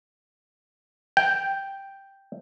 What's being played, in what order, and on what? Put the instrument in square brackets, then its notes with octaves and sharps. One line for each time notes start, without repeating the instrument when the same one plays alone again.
[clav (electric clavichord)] G5